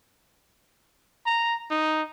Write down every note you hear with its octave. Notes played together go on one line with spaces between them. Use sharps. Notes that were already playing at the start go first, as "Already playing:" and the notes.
A#5
D#4